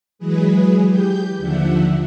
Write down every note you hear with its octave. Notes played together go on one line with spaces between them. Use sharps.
E3 F#3 G#3 G#4 B4
G4 G6
D#2 D3 F3 D4 E5 F#5